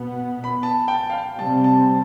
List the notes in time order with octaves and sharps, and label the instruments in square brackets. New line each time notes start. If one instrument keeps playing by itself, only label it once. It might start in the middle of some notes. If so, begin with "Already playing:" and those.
Already playing: [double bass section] B2 B3
[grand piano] B5
A5
G5
F5
G5
[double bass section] C3 G3 C4 [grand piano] A5
[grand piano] A5